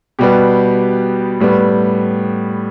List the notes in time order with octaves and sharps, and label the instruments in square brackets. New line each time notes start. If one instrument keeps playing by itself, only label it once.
[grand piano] B2 G3 B3 G4
A2 G3 B3